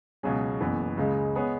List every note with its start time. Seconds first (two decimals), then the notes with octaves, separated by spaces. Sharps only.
0.23 C#2 B2 F#3 C#4 G#4
0.60 F#1 F#2 E3 B3
0.97 C#2 C#3 G#3
1.35 G#3 B3 G#4 C#5